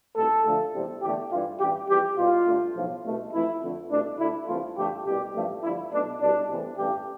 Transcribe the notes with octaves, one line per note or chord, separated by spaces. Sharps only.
C2 B2 A3 A4
D2 D3 F3 A3
E2 C3 G3
E2 D3 A3 G4
G2 E3 G3 F4
A1 G2 E3 G4
F2 E3 G3 G4
C2 B2 G3 F4
G2 D3 A3
B1 A2 F3
C2 B2 A3
F2 E3 A3 E4
F2 D3 A3
C2 B2 A3 D4
D2 D3 A3 E4
C2 C3 E3 A3 F4
G2 D3 F3 A3 G4
C2 B2 G3 G4
A1 G2 F3 A3
G2 D3 F3 A3 E4
B1 B2 A3 D4
C2 B2 G3 D4
E2 C3 E3 A3
A1 G2 E3 A3 G4